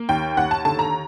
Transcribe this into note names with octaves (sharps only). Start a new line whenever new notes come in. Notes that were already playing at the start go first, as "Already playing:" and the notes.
Already playing: A#3
D#2 G5
D#2 F#5
A5
D3 A5
A#5